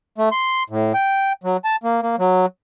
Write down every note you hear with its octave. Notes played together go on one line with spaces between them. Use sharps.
A3
C6
A2
G5
F#3
A5
A#3
A#3
F#3